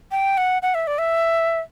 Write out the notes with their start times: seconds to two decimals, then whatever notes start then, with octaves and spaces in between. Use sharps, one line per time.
0.11 G5
0.37 F#5
0.62 F#5
0.75 E5
0.87 D5
0.98 E5